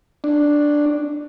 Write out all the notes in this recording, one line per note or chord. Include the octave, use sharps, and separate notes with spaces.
D4